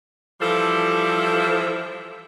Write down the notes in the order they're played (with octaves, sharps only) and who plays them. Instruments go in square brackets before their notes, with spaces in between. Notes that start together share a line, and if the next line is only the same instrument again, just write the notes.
[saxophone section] E3 F3 G3 A4